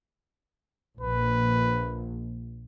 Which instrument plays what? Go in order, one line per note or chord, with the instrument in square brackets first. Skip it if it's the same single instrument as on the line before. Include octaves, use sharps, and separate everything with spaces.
[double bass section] A#1 [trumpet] B4